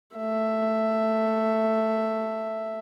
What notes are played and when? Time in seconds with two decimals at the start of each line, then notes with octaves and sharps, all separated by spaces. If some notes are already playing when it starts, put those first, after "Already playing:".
0.17 A3 E5